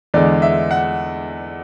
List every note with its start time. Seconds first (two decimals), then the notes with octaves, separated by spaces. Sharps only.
0.14 E2 D3 G#3 D5
0.42 E5
0.71 F#5